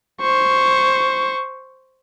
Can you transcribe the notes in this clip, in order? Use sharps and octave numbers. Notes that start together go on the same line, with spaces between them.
C5 C#6